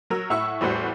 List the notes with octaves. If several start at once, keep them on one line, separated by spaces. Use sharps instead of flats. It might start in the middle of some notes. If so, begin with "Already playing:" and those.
F#3 A#4 E6
A2 E4 F#5 C#6 E6
E2 A2 G3 F#4 C5 F#5